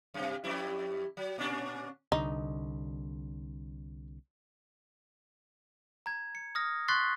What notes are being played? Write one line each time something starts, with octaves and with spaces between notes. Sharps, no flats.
F#2 C3
F2 G3 E4
F#3
A#2 C#4 D4
C2 D3 D#4
A#5 G#6
C#7
D#6 F6 A#6
C6 C#6 F#6 A6 B6 C7